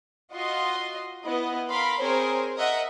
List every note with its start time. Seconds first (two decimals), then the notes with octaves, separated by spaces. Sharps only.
0.33 F4 F#4 D#5 C6
1.24 B3 E4 D#5
1.69 A#4 F5 B5 C6
2.01 C4 G#4 A#4 C5 C#5
2.56 A#4 D#5 E5 F#5